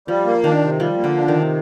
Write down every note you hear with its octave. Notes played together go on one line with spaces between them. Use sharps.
F3 G3
A#3
D#3 D4
C3
F3 G3
A#3
D3
D4
D#3
C3